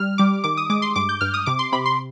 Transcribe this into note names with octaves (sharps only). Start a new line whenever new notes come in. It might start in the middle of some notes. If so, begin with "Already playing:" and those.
Already playing: G3 F6
G3 D6
D#3 D6
D#6
G#3 D6
C6
G2 D6
G6
G2 F6
D#6
C3 D6
C6
C3 B5
C6